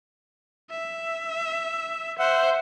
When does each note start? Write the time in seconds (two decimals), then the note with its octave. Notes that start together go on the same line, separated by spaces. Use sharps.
0.70 E5
2.19 C5 E5 F#5